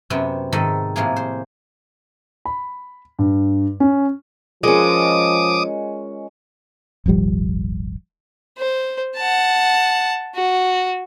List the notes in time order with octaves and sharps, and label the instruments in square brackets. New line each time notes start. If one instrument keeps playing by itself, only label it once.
[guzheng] F#2 C3 B3 C4 G5
G#2 D#3 A4 D#5
A2 C3 F3 A#3 G#4
C5
[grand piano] B5
G2
C#4
[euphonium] F3 [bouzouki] G#3 C#4 [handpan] F4 A#4 D5 [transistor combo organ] D6 D#6
[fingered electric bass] D#1 G#1 F3 G3
[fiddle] C5
F#5 A5
F#4